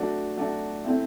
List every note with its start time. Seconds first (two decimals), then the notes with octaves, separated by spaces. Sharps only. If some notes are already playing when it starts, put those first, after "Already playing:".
Already playing: F#3 A3 D4 F#4
0.37 F#3 A3 D4 F#4
0.84 A3 C4 E4